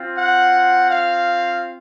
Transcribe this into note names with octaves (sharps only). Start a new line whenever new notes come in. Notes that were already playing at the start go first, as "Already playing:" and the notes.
Already playing: C4 F4
F#5
F5